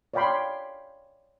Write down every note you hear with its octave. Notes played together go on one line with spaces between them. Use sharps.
C#5 D5 F5 G5 B5 C6